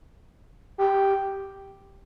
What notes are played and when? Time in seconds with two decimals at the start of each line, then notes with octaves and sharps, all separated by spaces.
0.78 G4